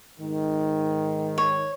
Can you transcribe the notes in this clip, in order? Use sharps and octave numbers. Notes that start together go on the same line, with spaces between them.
G#2 D#3
C#5